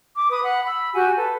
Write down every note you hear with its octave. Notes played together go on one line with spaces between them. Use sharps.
D6
B4 D#6
F#5 B5
B5 E6
F#4 G4 F#5 G#5
A4 B4